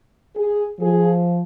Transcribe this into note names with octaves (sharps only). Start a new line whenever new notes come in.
G#4
F3 G#4